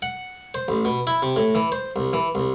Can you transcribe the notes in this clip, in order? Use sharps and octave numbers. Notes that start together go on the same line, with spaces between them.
F#5
C5
A1
B2
E4
C3
A2
E3
C5
C2
E3
C2